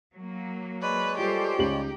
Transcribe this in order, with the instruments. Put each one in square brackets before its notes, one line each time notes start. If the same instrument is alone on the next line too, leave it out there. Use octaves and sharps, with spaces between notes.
[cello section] F#3 A#3
[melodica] G#3 C#5 D5 [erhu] B4
[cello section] G3 A4 C5 [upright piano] F4 [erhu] G4
[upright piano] C#2 F#7 [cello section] D#4